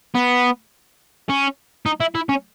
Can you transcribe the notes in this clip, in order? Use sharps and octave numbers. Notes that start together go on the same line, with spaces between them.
B3
C#4
D#4
E4
E4
C#4